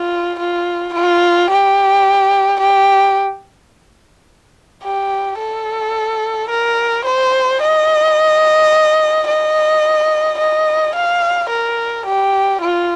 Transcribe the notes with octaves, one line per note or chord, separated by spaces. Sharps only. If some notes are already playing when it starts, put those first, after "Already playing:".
Already playing: F4
F4
F4
G4
G4
G4
A4
A#4
C5
D#5
D#5
D#5
F5
A#4
G4
F4